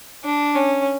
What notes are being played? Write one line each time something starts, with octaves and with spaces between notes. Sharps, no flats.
D4
C#4